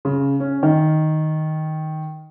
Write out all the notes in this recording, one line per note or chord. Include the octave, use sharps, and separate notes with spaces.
C#3
C#4
D#3